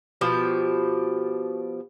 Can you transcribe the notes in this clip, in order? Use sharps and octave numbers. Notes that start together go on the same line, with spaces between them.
B2 F3 G4